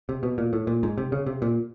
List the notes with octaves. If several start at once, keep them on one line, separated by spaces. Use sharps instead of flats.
C3
B2
A#2
A2
A#2
G#2
C3
C#3
C3
A#2